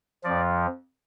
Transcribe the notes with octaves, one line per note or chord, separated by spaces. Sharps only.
F2 F3 D5